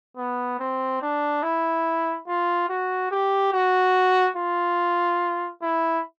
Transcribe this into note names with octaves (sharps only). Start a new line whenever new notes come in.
B3
C4
D4
E4
F4
F#4
G4
F#4
F4
E4